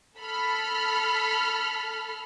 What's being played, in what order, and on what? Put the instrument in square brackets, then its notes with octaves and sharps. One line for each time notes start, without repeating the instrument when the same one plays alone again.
[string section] A4 B5 F6